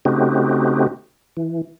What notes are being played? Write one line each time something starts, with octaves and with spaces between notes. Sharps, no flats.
C#3 A3 C4 D#4 F#4 G4
E3